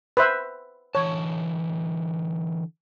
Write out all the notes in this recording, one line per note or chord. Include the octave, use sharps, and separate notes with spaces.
B4 C5 E5
D3 E3 C#5 A5